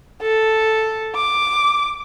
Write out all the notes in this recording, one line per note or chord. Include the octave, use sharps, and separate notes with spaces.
A4
D6